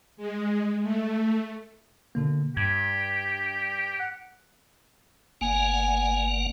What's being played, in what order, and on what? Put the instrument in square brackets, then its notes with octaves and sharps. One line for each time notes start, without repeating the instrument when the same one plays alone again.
[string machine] G#3
A3
[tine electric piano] B2 D3 A#3
[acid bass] G2 [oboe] G4 [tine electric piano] G#6
[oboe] F#5
[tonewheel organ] G1 A#3 F#5 [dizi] G#5